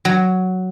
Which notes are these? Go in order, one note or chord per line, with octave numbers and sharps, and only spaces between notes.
F#3